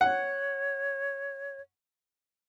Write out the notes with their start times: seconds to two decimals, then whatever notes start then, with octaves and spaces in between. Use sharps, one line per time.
0.01 C#5 F#5